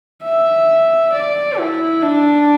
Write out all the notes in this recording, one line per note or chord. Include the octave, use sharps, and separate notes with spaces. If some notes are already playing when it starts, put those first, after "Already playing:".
E5
D5
E4
D4